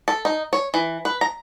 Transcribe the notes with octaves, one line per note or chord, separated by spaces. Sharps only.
A4
D#4
C#5
E3
B4
A#5